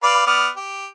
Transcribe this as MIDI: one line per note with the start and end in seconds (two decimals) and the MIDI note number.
0.03 0.26 71
0.03 0.26 74
0.03 0.26 77
0.27 0.48 59
0.27 0.48 74
0.27 0.48 89
0.57 0.86 67